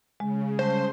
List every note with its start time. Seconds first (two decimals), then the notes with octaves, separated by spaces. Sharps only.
0.20 C#3 G#3
0.59 G3 C#4 C5 A5